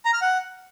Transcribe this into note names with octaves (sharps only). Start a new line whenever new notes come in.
A#5
F6
F#5